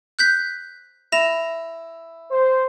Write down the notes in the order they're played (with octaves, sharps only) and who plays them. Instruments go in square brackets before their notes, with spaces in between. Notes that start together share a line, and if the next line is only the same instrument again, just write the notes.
[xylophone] F#6 G6 B6
[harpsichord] E4 [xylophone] A#6 E7 F7
[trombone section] C5